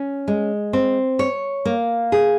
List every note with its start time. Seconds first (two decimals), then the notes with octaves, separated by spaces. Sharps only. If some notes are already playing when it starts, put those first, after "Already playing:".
Already playing: C#4
0.28 G#3
0.73 C4
1.19 C#5
1.65 A#3
2.12 G#4